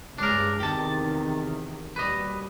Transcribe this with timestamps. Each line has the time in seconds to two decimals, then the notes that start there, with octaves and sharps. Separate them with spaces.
0.18 C#2 G2 G#3 D4 A#4
0.60 E2 C3 D#3 G4 A5
1.96 D#2 B2 G3 B4 D#5